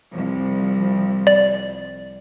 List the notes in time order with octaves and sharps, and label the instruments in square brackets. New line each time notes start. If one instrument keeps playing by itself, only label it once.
[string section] C2 F3
[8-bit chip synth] D5